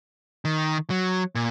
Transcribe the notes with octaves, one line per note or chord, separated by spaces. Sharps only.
D#3
F#3
A#2